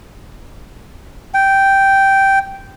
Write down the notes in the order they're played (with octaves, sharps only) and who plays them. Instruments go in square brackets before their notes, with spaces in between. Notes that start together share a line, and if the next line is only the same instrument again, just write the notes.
[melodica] G5